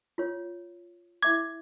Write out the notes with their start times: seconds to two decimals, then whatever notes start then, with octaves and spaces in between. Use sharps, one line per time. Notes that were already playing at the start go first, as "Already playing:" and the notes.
0.18 F4 C#5
1.22 E4 E5 D6 G#6